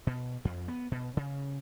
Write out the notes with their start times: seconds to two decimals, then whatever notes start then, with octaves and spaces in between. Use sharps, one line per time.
0.07 B2
0.45 F2
0.68 B3
0.92 B2
1.17 C#3